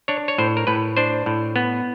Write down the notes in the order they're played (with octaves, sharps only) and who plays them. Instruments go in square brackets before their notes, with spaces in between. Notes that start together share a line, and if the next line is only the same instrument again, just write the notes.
[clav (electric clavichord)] D4 C#5
C#5
A2 C5
A#4
A2 B4
D4 C5
A2
B3